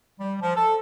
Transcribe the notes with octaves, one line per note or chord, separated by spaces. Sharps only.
G3
F3
A4